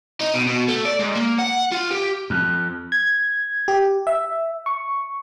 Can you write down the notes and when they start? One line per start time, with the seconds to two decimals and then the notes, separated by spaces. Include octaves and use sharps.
0.21 D#4
0.34 B2
0.47 B2
0.68 A3
0.85 D5
0.99 G#2
1.15 A#3
1.38 F#5
1.72 F4
1.91 G4
2.30 F2
2.92 G#6
3.68 G4
4.07 E5
4.66 C#6